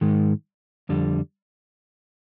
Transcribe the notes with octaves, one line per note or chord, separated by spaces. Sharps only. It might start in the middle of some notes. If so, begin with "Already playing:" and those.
G#2 D#3 G#3
F2 D3 G3